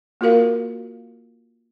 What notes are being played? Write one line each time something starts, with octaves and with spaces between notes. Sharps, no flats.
A#3 F4 F#4 A#4 F5